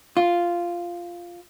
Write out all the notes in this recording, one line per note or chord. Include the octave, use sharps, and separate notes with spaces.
F4